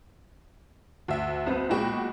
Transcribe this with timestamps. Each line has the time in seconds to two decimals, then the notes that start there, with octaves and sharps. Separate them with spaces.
1.08 D2 E5
1.46 B1 C4 B4
1.69 B1 A#2 G#3 F#4 G5 B5